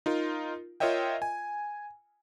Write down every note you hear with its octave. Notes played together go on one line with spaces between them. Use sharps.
D#4 F4 A#4
F4 A#4 C#5 D#5 E5 G5
G#5